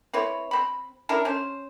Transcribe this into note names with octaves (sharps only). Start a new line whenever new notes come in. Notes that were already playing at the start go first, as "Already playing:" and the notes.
C4 E4 B4 C#5
C4 B5
C#4 D4 E4 A#4
C#4 C5